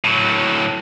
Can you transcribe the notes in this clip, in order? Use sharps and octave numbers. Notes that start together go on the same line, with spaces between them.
A2 F#3